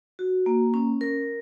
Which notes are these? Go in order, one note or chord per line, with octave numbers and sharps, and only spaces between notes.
F#4
A#3
C#4
A#4